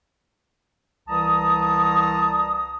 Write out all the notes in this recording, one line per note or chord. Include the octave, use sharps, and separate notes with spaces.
C2 E3 A5 A#5 D#6